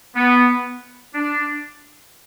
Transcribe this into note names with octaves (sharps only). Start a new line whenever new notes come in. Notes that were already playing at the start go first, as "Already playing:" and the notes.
B3
D4